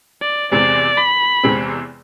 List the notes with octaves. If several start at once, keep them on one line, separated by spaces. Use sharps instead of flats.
D5
E2 C3 E3 G#3 C4 D5
B5
E2 C3 E3 G#3 C4